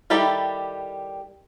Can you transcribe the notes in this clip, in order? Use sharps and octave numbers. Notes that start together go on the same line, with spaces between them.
D#3 G3 E4 G4 A4